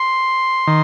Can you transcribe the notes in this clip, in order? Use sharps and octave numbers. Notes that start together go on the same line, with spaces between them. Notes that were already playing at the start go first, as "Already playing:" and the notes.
Already playing: C6
D#3